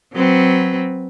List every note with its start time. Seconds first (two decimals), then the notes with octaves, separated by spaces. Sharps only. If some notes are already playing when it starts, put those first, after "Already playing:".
0.13 F#3 C4 B4